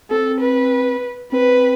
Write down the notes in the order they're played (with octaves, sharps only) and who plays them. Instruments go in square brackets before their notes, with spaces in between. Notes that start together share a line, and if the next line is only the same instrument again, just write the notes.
[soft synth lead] C4 [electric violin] A4
[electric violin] B4
[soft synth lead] C4 [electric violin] B4